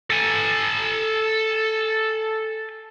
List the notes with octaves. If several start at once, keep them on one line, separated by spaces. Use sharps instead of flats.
A4 G#5